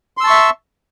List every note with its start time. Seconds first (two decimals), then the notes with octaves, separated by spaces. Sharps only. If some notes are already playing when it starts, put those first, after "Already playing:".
0.17 C6
0.21 E6
0.24 A5
0.27 C#6
0.30 E5